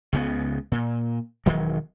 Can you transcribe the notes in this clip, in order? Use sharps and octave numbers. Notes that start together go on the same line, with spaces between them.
C#2 C#3 B3
A#2
E1 D#3 F#3